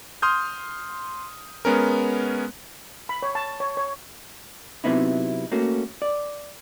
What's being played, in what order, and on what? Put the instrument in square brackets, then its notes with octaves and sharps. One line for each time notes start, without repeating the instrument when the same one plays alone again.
[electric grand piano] C6 D#6 F6 G6
G#3 B3 C#4 A#4
[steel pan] B5
C#5
A5
C#5
C#5
[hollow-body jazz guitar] C3 F#3 B3 D#4 E4
A3 A#3 C#4 F#4
D5